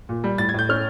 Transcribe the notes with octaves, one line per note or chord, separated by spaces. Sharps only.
A#2
G3
A2 A6
G#6
A2 G6
C#4 F6